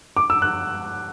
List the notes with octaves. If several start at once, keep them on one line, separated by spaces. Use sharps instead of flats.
D6
E6
F#6